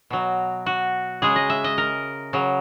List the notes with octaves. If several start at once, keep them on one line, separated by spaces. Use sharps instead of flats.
B2 F#3
F#4
C#3 G#3 G#4
D#5
E5
D#5
A#4
C#3 F#3